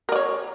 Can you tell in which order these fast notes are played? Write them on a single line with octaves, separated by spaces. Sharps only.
A#4 D5 C#5